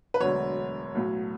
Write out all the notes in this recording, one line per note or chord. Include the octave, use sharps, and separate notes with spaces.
B4
E1 D2 D3 F#3 C#5
B1 A2 F#3